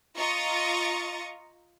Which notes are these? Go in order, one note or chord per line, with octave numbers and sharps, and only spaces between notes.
F4 D#5 A#5 C#6 D#6 A6